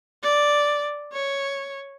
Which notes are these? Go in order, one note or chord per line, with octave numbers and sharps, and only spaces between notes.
D5
C#5